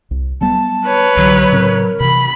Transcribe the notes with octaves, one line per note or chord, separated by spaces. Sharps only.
C2
F#3 G3 B3 A5
B4 C#5
C2 D3 E3 F#3 G4
A2 C#3 C4 A#4
C3 E3 B5